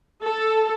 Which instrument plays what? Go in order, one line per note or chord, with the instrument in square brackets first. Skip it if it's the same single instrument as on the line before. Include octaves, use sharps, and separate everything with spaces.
[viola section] A4